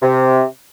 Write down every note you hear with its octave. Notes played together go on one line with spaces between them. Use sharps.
C3